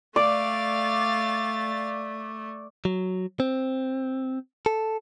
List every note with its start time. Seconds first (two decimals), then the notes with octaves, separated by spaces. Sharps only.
0.16 A3 D5 F5 A6
2.85 F#3
3.40 C4
4.66 A4